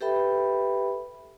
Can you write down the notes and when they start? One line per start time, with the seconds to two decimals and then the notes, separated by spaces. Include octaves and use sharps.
0.01 G4 A4 B4 E5 G5 B5